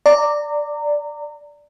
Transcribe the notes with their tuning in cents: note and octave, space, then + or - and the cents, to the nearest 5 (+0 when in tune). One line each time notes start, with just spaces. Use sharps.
D5 +0 A#5 -25